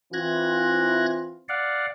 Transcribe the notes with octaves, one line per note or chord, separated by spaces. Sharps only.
E3 C4 F4 F#6 G#6 A#6
D5 F5 F#5